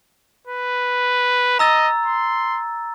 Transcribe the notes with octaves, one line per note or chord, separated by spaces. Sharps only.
B4
D#5 A#5 E6 A6
C6